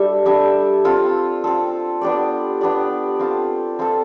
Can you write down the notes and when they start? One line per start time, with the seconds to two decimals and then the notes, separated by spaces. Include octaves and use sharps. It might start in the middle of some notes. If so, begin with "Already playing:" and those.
Already playing: G3 D4 A4 E5
0.26 G3 D4 A4 E5
0.84 C4 F4 A4
1.44 C4 F4 A4
2.01 B3 D4 G4 D5
2.61 B3 D4 G4 D5
3.19 C4 F4 A4
3.79 C4 F4 A4